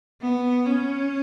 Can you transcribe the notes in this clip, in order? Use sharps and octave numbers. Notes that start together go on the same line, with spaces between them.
B3
C#4